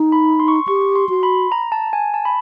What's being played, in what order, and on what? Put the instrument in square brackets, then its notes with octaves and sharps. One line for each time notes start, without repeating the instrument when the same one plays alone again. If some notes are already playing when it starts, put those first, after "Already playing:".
Already playing: [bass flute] D#4
[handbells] B5
C6
C#6
C6
[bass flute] G4 [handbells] C#6
[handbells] C6
[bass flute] F#4 [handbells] C6
[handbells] B5
A#5
A5
G#5
A5
B5